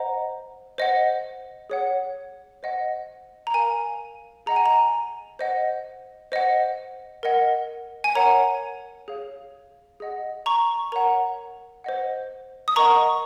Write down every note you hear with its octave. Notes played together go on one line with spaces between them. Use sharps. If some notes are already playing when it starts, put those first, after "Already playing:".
Already playing: C5 D#5 F#5 A#5
C5 D#5 F#5
G#4 C#5 F#5
C5 D#5 F#5
A#5
A#4 G#5
F5
G#4 D#5 F#5 A#5
G#5
A#5
C5 D#5 F#5
C5 D#5 F#5
A#4 D#5 F#5
G#5
A#4 C#5 F#5 A#5
G#4 C#5 F5
G#4 D#5 F#5
A#5 C#6
A#4 C#5 F#5 A#5
C5 D#5 F#5
D#6
A#4 D#5 F#5 A#5 C#6